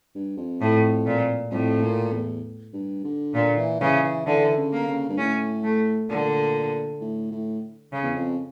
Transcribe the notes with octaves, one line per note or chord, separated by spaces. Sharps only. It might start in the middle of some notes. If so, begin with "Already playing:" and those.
G2
F2
A2
A#2
F2 A2
A#2
E2
G2
D3
A#2 D3
E3
C#3 E3
E3
D3 E3
C#3
A#3
C#3
G2
A2 C#4
A3
A#2 D3
A2
A2
C#3
E2
F2